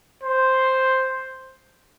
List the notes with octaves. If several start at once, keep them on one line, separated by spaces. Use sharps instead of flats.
C5